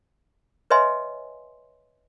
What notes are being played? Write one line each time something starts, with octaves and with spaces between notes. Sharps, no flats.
B4 C#5 D#5 E5 G#5 C6